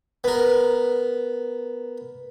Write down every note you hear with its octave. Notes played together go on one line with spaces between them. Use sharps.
B3 A#4